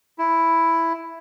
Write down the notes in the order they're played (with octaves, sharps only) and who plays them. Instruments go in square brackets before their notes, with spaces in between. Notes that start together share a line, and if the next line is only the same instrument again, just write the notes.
[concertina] E4